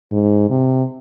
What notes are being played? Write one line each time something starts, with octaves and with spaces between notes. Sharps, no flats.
G#2
C3